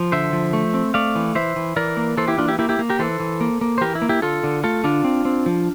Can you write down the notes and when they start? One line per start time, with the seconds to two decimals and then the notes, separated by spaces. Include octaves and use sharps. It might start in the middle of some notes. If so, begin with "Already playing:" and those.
Already playing: F3
0.12 D3 C5 E5
0.33 F3
0.53 A3
0.74 C4
0.94 A3 D5 F5
1.15 E3
1.35 E3 C5 E5
1.56 E3
1.76 E3 A#4 D5
1.97 A#3
2.17 E3 A4 C5
2.28 E4 G4
2.38 A#3 D4 F4
2.48 E4 G4
2.59 A#3 E4 G4
2.69 E4 G4
2.79 A#3
2.90 G4 A#4
2.99 E3 A4 C5
3.20 E3
3.41 A#3
3.61 A#3
3.78 C5
3.81 E3 G4 A#4
3.95 E4
4.02 A#3
4.09 E4 G4
4.22 D3 F4 A4
4.44 D3
4.64 A3 F4 A4
4.84 D3 D4 F4
5.04 C4
5.25 C4
5.46 F3